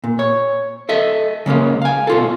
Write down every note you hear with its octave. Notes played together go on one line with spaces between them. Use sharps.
A#2
C#5
A4 D#5 E5
C#3 G#3 A#3 C#4
F5 G#5
B2 F4 A4